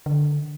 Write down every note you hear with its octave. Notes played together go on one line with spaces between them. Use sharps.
D3